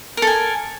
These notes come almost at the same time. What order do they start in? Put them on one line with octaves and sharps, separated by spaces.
A#4 A4 G#5